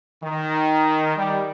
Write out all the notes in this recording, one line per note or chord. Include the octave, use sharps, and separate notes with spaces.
D#3
G3